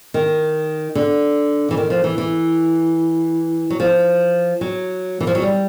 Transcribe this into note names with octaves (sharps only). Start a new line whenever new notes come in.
D#3
D3
E3
D#3
F3
E3
E3
F#3
F3
F#3
E3
F3
F#3
G3